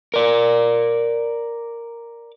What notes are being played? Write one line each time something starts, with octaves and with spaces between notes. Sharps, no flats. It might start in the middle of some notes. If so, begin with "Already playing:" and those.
A#4 D5